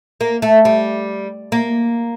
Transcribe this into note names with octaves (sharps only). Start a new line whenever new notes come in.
A#3
A3
G3
A#3